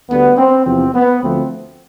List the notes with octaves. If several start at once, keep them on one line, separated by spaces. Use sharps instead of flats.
D2 D3 G3 B3
C4
E2 C3 F3 B3 C4
B3
D2 D3 F3 A3 C4